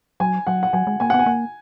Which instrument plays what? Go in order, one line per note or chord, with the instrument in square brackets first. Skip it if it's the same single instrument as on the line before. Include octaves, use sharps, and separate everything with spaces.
[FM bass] F#3 [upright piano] G#5
[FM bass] F#3 [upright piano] F#5
[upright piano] F#5
[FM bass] F#3 [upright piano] G#5
[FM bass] G#3
[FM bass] A#3 [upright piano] G#5
[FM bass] B3 [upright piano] F#5
[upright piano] G#5
[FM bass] A#3